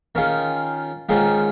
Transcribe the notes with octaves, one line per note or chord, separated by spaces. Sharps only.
D#3 C#4 F4 G#4
G#2 D#3 C#4 F4 G#4